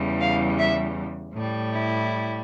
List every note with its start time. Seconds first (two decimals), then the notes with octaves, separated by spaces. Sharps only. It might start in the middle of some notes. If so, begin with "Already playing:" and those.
Already playing: E2 C#3 E3 G3
0.21 F5
0.58 E5
1.34 A2 G3
1.73 E4